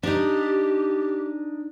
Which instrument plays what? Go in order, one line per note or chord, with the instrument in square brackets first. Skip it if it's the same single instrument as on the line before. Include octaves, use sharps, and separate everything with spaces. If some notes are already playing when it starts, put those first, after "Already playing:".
[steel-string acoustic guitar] D4 D#4 [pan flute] G4